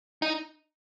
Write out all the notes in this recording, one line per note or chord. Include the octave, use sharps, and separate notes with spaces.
D#4